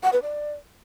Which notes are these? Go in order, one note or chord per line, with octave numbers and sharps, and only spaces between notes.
F#5
B4
D5